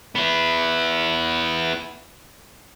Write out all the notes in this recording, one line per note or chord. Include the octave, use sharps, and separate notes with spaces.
B3 E4